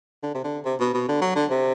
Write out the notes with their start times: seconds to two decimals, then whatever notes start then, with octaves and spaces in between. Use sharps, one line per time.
0.23 D3
0.34 C3
0.44 D3
0.65 C3
0.80 B2
0.94 B2
1.08 D3
1.22 F#3
1.36 D3
1.51 C3